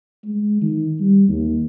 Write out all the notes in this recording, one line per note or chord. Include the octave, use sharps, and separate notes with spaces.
G#3
D#3
G3
D#2